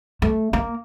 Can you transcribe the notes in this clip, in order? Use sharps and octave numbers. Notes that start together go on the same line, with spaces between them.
A3
A#3